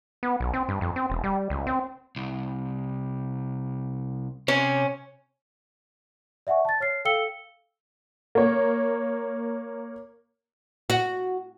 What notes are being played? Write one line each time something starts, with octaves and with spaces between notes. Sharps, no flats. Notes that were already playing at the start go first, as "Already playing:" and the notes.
B3
B1
C4
G2
F2
C4
E1
G3
C#2
C4
C2
C3 C#4
D5 E5 F#5 G#5 C#6
A5 A6
C#5 F6 C7
A4 F5 G5 E6 C#7 G7
A#3 C#5
F#4